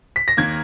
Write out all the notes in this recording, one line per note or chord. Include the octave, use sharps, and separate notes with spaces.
B6
A#6
D#2 D#3 A#3 G#6